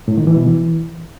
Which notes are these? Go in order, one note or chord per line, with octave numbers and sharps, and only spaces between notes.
A2
D#3
E3
B2
E3